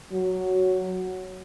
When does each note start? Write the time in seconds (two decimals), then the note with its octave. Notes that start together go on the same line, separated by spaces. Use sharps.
0.12 F#3